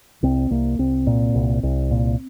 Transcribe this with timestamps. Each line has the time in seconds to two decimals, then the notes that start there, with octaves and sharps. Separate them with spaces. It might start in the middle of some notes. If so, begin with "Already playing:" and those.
0.23 C2 C4
0.50 C2 A#3
0.79 C2 C4
1.07 A#2
1.35 C2
1.63 C2
1.91 A#2